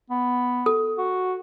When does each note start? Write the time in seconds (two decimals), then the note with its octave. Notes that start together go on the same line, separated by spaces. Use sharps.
0.10 B3
0.66 A4
0.98 F#4